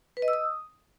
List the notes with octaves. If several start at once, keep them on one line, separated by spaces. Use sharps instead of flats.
B4
D#5
E6
D#6